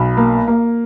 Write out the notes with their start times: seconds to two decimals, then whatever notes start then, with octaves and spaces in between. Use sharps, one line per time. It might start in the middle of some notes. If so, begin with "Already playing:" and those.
Already playing: B1 B5
0.17 A#3
0.47 A#3